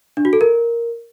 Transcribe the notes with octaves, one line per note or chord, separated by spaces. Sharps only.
D4
F#4
A4
A#4